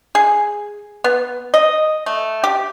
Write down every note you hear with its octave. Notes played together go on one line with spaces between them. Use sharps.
G#4
B3
D#5
A3
G4